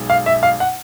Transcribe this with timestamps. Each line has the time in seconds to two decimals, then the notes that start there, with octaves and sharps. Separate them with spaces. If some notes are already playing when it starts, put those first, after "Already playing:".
Already playing: B1 B2 G#3
0.10 F5
0.26 E5
0.43 F5
0.60 F#5